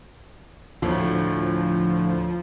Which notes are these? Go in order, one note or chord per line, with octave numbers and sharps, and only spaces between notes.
D2 A2 F3